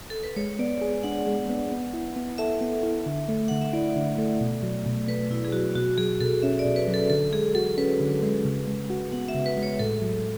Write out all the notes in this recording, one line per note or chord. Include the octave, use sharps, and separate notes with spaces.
A4
B4
G#3 C#5
B3 D5
G#4
D4 F#5
G#3
B3
B3
E4
B3
A4 E5
B3
E4
D3
A3
D3 F#5
E5
E4 D5
D3
A3
B2
F#3
B2
A3 B4
B2 E4
G#4
F#3 F#4
B2 F#4
F#3 G#4
B2 A4
C#4 E5
D5
B2
B4
F#3
A4
D3 A4
G#3 G#4
F#4 A4
C#4 B4
D3
G#3
C#3
G#3
F#4
B3 F#5
E5
C#3
B4
G#3
C#5
A2 A4
F#3